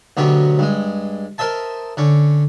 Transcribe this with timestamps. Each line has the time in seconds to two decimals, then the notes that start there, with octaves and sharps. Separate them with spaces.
0.17 D2 B2 F#3 C#4 G4
0.59 G2 G#3
1.38 A#4 C5 D#5 E5 A5
1.97 D3 C#4